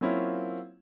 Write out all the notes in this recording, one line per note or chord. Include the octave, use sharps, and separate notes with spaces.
F#3 A#3 C4 C#4 E4 F4